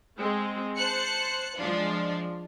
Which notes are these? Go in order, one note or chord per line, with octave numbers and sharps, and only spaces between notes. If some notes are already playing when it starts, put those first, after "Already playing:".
G#3 C4
C5 A5 F#6 C#7
F3 G#3 D4 F4